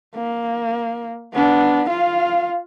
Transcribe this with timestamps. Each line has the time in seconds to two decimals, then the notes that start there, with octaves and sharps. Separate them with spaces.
0.15 A#3
1.34 B3 D4
1.90 F4 F5